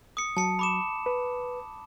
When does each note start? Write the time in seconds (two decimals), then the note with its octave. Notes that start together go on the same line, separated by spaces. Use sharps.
0.17 D#6 C#7
0.37 F#3 A5 C#7
0.59 B5 D6 E7
1.06 B4